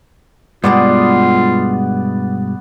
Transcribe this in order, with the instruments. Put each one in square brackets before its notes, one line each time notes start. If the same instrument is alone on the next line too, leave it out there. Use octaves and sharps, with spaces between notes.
[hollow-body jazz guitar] G2 B2 G#3 [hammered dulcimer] B3 D5 [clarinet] F4